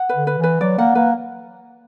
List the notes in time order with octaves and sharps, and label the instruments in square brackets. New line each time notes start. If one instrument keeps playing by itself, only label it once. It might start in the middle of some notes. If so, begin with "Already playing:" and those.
Already playing: [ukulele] F#5
B4
[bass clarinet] D3
[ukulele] B4
[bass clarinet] E3
[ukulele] B4
[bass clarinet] F#3 [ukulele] D5
[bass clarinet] A#3 [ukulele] F#5
[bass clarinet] A#3 [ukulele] B4